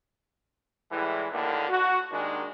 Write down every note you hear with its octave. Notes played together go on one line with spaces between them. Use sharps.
A2 E3 G3 G#3
D#2 A2 D3 A#3
F#4
D#2 D#3 G#3 D4